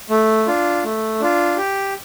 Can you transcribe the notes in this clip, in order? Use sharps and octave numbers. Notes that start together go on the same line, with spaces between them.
A3
D4 F4
A3
D4 F4
G4